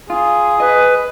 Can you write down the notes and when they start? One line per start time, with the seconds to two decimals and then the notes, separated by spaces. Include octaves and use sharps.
0.10 F4 G#4
0.60 B4 D#5